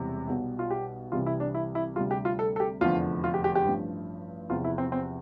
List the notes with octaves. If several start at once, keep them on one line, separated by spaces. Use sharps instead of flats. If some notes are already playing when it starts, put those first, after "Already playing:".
Already playing: E1 E2 C3 E3 G3
B1 B2 G3
F4
G4
C2 C3 E3 G3 F4
E4
D4
E4
E4
D2 C3 G3 F4
G4
F4
A4
A4
G4
F1 E2 D3 F3 F4
F4
G4
G4
G4
A1 G2 F3
E2 C3 F3 F4
E4
C4
C4